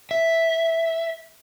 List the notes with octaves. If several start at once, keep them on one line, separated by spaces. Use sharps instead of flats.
E5